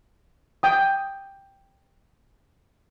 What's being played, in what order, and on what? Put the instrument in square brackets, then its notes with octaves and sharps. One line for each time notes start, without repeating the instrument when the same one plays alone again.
[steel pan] G5 D#6